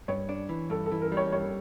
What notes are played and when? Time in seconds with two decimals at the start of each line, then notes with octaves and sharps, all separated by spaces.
0.08 G2 C#5
0.29 D4
0.49 E3
0.70 G2 A4
0.86 A4
0.92 E3
1.01 A#4
1.12 G3
1.17 C#5
1.32 G2 C#5